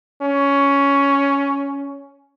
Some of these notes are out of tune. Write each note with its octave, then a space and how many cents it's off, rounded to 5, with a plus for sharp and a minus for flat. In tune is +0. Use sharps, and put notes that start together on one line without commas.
C#4 +10